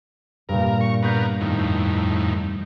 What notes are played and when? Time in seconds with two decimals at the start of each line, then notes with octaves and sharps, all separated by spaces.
0.49 G2 A#2 A#4
0.81 C#6
1.02 B3 A#4 G6 B6 C7
1.41 F2 A2 D#3